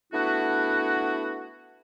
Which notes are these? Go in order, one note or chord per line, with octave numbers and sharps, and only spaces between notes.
A3 B3 D4 E4 F#4